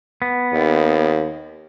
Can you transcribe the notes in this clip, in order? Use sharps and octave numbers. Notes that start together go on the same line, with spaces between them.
B3
D#2